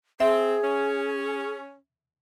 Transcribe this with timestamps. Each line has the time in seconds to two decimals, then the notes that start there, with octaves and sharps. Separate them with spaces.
0.20 C4 G#4 E5
0.63 C#4